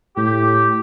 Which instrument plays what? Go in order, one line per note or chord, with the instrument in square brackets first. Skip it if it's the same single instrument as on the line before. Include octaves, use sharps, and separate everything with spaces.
[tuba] A2 [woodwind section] G4